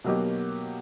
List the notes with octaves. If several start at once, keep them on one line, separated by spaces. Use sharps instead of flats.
B2 F#3 A#3 D#4 G4